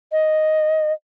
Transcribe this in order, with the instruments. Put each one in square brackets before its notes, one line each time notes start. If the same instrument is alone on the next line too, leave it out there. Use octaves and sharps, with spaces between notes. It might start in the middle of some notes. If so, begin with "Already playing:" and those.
[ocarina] D#5